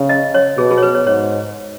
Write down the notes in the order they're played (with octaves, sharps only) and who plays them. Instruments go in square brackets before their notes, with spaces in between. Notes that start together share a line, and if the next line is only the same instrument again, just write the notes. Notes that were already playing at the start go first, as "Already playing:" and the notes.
Already playing: [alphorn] C#3
[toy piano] D#5
C#5
[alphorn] B2 [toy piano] G#4
[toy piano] G#4
C#5
B4
C#5
[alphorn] G#2 [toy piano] C#5